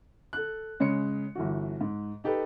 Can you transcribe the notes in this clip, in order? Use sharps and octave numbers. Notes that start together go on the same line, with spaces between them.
A4 F#6
C#3 G#3 C#4 C#7
G1 E3 F#4
G#2
D#4 G4 A4 B4